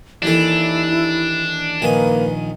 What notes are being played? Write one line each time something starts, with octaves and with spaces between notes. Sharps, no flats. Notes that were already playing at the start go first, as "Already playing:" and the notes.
D#2 E3 D4 E4 A4
A#1 D#3 A#3 B4 G#5